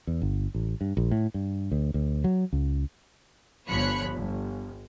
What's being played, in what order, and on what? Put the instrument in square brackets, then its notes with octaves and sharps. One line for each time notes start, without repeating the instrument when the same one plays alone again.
[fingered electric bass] E2
G1
A1
G2
A#1
A2
G2
D2
D2
F#3
C#2
[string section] G1 F3 C#5 B5 F#6 C#7
G1